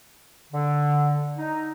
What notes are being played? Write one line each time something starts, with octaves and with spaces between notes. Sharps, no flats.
D3
D#4